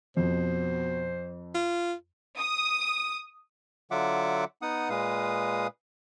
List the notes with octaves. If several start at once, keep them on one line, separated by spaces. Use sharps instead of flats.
F2 B2 C5
F4
D#6
D3 F#3 F4 E5 F#5 D6
B3 D#4 F#5 D#6
A#2 G#3 B4 F5 D#6